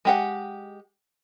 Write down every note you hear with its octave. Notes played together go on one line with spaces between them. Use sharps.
G#3 G4 F#5